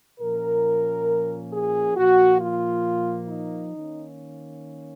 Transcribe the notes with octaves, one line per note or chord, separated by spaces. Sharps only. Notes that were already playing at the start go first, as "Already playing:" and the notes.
A#2 F3 A#3 C#4 A#4
G#4
A#2 F3 A#3 F#4
F4
D#4
D#3 A#3 C#4